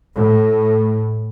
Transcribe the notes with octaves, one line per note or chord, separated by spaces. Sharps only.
A2